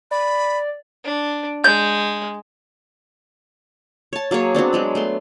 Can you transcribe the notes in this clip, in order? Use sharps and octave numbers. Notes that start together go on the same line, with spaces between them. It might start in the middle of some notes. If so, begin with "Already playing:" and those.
D5 B5
D4
G#3 G6
C#5 A5
F#3 A#3 G#4 C#5
F#3 B3 C4 D4
F#3 G#3 B5
A3 B3 C6